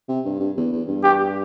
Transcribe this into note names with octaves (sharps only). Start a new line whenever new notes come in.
C3
G2
G2
E2
E2
G2
G4